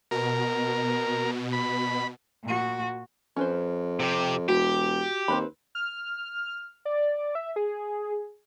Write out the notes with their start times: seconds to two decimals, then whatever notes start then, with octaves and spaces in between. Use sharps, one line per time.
0.11 B2 A#4
1.53 B5
2.43 A#2 F#4
3.37 F2 C#4 B4 C5
4.00 C3 G4
4.48 E1 F#4 G4
5.28 D#2 C4 B4 B5
5.75 F6
6.85 D5
7.35 E5
7.56 G#4